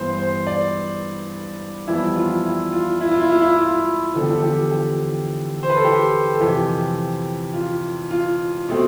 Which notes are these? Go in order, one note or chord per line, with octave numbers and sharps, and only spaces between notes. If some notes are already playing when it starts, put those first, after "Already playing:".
Already playing: G2 E3 B3 C5
C5
D5
F2 E3 G3 B3 E4
F4
E4
F4
E4
F4
E4
F4
E4
F4
E2 D3 F3 A4
G4
A4
G4
G4
C5
B4
A4
G4
A4
F2 C3 E3 G4
F4
F4
B2 A3 C4